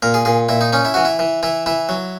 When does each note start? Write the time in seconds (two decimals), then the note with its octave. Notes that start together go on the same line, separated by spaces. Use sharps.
0.02 A#2 A#4
0.14 G#4
0.25 A#2 G#4
0.49 A#2 E4
0.61 D#4
0.73 C#4 D#4
0.85 E4
0.94 E3 F#4
1.05 E4
1.19 E3
1.43 E3 E4
1.66 E3 E4
1.89 F#3